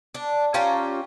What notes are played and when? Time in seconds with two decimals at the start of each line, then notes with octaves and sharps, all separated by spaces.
0.15 D4
0.54 C#4 F4 G4 A#5